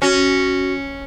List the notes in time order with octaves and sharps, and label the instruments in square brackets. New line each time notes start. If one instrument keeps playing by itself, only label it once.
[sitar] C#4 [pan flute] F#4